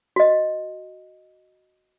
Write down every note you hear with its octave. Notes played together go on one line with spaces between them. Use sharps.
F#4 D#5